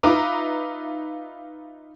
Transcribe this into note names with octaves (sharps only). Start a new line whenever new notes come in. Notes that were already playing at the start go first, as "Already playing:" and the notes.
D#4 F4 B4 E5 A#5 D6